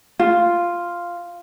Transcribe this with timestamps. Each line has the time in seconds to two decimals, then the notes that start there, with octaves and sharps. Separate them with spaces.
0.19 F4